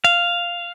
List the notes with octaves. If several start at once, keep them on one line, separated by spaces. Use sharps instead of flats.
F5